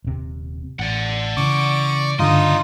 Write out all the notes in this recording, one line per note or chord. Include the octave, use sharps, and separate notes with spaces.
D#1 C3
A1 D5 F#5
C#3 E3 C#6 D6
G2 D3 D4 D#4 F4 D#5